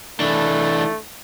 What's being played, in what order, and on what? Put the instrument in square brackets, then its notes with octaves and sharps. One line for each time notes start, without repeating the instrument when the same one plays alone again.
[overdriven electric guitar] E3 D4 [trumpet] A3